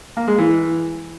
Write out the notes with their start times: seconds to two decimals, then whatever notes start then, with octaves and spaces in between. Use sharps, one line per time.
0.17 A#3
0.28 G#3
0.38 E3